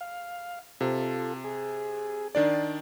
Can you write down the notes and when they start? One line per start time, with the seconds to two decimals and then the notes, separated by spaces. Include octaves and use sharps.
0.01 F5
0.81 C3 F4 A4
1.44 G#4
2.35 D#3 D4 D5